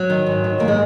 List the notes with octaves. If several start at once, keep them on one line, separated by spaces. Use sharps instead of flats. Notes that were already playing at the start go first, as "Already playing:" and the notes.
Already playing: F#3
D#3
G#2
D#3
G#2 A#3
G#3